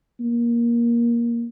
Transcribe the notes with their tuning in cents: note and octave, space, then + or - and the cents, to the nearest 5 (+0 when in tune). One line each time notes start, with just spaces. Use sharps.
A#3 +15